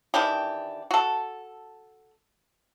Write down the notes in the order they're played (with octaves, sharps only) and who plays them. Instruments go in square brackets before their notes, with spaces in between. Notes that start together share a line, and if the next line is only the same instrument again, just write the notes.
[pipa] D#3 E3 D4 G4
F#4 A4